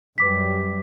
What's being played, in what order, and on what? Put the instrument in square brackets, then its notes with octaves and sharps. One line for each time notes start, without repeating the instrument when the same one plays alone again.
[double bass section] F#2 G3 [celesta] B4 D6 B6